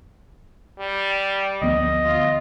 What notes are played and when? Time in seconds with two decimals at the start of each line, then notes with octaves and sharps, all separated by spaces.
0.79 G3
1.61 D2 F3 B3 D#5
2.05 F4